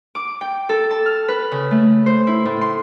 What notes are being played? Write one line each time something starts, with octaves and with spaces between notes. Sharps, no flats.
D6
G5
A4
A5
F6
B4
C#3
A3
C5
E4
A2
C6